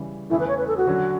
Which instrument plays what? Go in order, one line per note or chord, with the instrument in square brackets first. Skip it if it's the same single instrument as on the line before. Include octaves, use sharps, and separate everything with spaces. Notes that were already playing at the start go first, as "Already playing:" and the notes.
Already playing: [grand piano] C#3 E3 G3
[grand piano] E2 C#3 E3 A3 [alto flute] E4
[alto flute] B4
C#5
B4
A4
F#4
[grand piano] D3 F#3 C#4